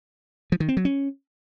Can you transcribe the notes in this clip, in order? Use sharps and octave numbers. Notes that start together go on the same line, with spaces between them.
F3
D#3
C4
F#3
C#4